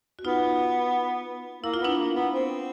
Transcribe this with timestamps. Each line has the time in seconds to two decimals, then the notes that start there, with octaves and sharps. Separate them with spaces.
0.19 F#4
0.24 B3 D#4 F4
1.63 A#3 E4
1.74 F4
1.81 B3 D4 E4
1.98 A#3
2.15 B3
2.33 C4